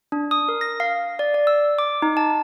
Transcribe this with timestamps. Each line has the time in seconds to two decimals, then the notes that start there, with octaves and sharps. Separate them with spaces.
0.12 D4
0.31 D#6
0.49 A#4
0.61 A#6
0.80 F5
1.19 D5
1.34 D5
1.47 E6
1.79 D6
2.02 D#4
2.17 A5